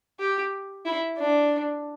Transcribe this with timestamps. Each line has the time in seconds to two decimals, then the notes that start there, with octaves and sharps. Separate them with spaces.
0.20 G4
0.85 E4
1.18 D4